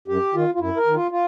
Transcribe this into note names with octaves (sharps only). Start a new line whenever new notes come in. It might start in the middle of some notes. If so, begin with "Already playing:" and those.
F#2 G4
D#3 F4
F4
F#2 E4
A#4
D#3
F4
F4